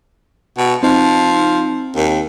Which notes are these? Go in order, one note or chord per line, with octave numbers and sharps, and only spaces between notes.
B2
F3 C4 D#4
D#2